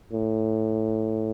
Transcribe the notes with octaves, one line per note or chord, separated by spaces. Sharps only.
A2